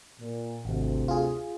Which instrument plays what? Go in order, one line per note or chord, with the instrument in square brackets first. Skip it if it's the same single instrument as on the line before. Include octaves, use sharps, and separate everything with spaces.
[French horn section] A#2
[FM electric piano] G#1 [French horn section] D2 C3
[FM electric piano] F4 G#4